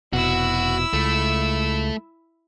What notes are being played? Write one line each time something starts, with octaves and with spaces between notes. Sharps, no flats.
F1 B2 E4 F#4 E6
C#2 A3